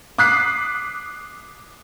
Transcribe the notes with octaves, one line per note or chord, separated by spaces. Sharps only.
D6 D#6 F#6 B6 C7